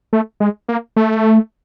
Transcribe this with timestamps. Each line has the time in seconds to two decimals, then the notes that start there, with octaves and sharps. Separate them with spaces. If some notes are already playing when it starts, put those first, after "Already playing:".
0.13 A3
0.40 G#3
0.69 A#3
0.96 A3